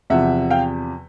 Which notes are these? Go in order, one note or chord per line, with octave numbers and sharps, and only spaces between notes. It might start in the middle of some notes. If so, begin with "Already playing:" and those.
E2 C3 F3 E5 F#5
F5 G5